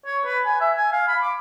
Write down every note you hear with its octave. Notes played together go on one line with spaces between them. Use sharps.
C#5
B4
G#5
E5
G#5
F5
B5
D6